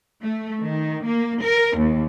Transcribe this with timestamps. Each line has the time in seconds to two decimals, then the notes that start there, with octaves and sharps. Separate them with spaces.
0.23 A3
0.61 D#3
1.05 A#3
1.43 A#4
1.77 D#2